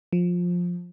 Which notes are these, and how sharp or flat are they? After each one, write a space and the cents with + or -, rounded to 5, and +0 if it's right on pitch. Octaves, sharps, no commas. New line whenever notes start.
F3 +15